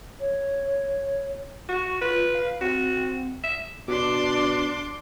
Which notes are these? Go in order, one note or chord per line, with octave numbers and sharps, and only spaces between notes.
C#5
F#4 C#6
F4 B4
F5
C4 F#4
E5
B2 D4 C6 D6